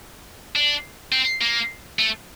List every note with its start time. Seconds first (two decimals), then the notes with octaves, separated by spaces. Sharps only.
0.56 D4
1.12 C4
1.41 A#3
1.99 A3